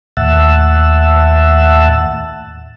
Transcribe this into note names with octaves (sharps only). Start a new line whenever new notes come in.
D#2 A2 E5 F#5 A5 E6